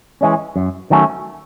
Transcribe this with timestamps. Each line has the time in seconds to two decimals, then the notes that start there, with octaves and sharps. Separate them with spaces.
0.21 E3 G#3 C#4
0.56 F#2
0.90 D#3 F#3 A3 C#4